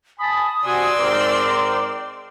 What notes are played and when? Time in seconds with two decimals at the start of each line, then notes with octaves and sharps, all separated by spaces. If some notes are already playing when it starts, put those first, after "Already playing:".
0.19 G#5 A5 B5 D#6
0.65 C3 F#4 D5 G#5 C6 E6
0.99 G#2 C4 A#4 D6